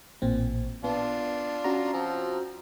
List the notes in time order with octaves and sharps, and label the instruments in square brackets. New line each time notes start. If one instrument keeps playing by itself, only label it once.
[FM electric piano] A1 A#2 C4
[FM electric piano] B3 [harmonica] D4 F4
[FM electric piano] C#4 F#4 A#5
[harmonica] F3 C4